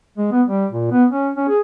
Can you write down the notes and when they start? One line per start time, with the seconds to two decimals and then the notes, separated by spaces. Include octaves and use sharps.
0.18 G#3
0.32 B3
0.48 G3
0.72 A#2
0.91 B3
1.10 C#4
1.37 C#4
1.48 G#4